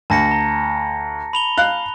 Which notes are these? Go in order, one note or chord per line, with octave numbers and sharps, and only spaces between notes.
D2 A5 A#6 C#7
A#5
B5 F7 G7
F5 F#6